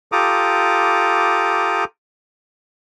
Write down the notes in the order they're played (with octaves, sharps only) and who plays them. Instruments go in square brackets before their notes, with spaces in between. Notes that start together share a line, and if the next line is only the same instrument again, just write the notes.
[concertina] F4 G4 A4 A#5 D6 D#6